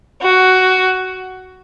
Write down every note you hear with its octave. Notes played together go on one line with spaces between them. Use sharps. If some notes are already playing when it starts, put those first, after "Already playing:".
F#4